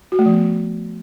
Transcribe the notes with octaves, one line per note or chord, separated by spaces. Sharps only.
F#4
A3
F3
B3